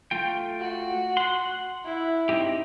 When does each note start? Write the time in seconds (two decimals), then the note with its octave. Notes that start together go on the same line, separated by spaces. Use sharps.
0.11 A3 F4 G5
0.59 F#4
1.17 F#5 C6
1.85 E4
2.29 C4 D#4 G4